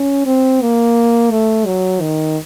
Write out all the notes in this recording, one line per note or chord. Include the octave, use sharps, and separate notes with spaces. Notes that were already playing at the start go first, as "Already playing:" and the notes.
Already playing: C#4
C4
A#3
A3
F#3
D#3